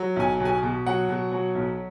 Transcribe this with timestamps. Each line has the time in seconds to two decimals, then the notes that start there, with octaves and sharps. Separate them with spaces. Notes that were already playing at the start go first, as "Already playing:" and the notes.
Already playing: F#3
0.16 B1 G#5
0.40 B2
0.45 G#5
0.63 B2
0.86 F#3 F#5
1.09 B2
1.32 F#3
1.55 B1